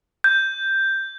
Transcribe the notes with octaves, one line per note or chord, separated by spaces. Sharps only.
G6